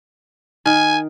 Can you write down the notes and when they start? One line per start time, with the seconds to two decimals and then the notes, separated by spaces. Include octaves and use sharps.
0.66 D#3 G#5